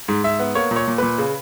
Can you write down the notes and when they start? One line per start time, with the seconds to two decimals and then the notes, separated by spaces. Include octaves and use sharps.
0.08 G#2
0.24 G#2 E5
0.39 B3
0.55 A#3 C#5
0.71 A#2
0.76 C#5
0.88 A#2
0.98 A#2 B4
1.18 C#3